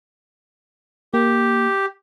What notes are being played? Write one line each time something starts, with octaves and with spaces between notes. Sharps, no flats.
A#3 G4